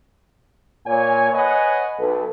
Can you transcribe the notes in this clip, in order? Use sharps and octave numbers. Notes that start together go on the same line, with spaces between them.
A#2 C#5 G#5
B4 C#5 D#5 F#5 G#5
B1 A4 B4